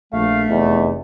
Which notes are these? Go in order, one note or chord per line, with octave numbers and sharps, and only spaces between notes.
A#1 A3 F5
F1 E2 D#5